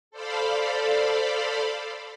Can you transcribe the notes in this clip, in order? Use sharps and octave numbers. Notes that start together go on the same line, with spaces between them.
A4 C5 D5 F5 B5